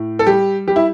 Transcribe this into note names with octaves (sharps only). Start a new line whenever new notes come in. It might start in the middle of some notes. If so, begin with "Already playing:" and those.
Already playing: A2
A4
G3 G4
G3 G4
E4